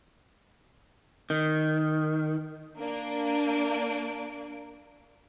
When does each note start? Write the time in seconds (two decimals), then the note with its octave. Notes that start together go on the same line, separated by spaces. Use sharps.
1.30 D#3
2.78 A#3 D4 D7